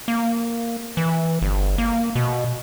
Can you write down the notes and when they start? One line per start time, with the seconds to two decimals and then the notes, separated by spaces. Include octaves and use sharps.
0.08 A#3
0.97 E3
1.42 G1
1.78 A#3
2.15 B2